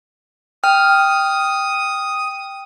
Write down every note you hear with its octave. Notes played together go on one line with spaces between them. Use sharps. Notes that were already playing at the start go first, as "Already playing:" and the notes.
G5 D#6 F6